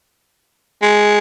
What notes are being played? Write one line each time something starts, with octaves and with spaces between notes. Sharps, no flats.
G#3